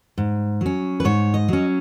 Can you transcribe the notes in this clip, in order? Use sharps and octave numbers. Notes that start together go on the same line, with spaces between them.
G#2
F#3 C#4
B4
G#2 C#5
D#5
F#3 C#4